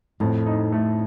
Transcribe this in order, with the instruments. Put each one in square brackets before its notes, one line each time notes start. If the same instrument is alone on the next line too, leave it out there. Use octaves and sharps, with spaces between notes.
[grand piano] F2 [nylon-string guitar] A2
[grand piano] D#4
A3